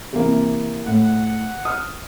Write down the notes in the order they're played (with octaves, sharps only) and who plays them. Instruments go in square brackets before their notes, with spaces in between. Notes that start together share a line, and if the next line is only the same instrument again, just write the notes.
[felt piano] C3 E3 A#3
[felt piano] A2 [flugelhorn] F#5
[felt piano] D#6 F6